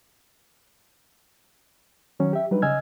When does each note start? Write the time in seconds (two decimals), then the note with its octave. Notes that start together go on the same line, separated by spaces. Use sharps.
2.20 D#3 F#3 C#4
2.33 G4 E5
2.51 F#3 G3 D4 D#4 B4
2.62 C#3 D#5 G#5 E6 F6 G#6